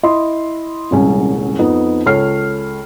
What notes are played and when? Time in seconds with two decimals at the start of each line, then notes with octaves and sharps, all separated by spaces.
0.03 E4 D#5 C6
0.91 D#1 C2 G#3 C#4
1.59 F2 B3 D#4
2.06 C#2 A4 C#5 F6 C7